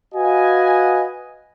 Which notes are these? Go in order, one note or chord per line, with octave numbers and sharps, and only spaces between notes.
F#4 B4 D#5 F5 F#5 G#5